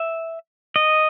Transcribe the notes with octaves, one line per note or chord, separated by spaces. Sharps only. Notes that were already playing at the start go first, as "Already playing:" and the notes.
Already playing: E5
D#5